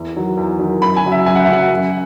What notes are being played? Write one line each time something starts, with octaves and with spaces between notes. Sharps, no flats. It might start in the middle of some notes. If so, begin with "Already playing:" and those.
Already playing: E2
D#3 F#3
E2
D#3 F#3
F#2 B5
G#5
C#3 F#3
E5
F#2 G#5
F#5
E5
C#3 F#3 F#5
F#2